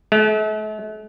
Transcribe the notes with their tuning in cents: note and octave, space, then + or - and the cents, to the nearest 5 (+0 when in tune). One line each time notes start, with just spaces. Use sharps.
A3 -45